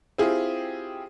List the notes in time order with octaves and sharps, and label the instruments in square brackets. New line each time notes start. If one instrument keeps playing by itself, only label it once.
[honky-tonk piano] C4 E4 F4 G4 G#4